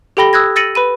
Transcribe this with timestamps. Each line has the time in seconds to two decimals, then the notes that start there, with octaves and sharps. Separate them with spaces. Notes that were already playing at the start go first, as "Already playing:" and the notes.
0.17 G4 A4 G5 B5 A#6 G7
0.33 D#6 E6 F#6 G#6 A#6
0.56 E6 A6 A#6 C#7 D#7 F#7
0.75 B4 B5 D#7